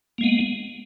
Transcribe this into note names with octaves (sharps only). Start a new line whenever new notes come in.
G#3 A#3 B3